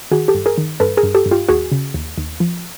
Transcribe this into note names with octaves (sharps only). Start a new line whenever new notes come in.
D#3 F#4 G#4
G4 A4
G2
G#4 A#4
D#3
G2 A4 B4
G#4 A#4
G2
G4 A4
G2
F4 G4
D#2 F#4 G#4
C#3
D#2
D#2
F3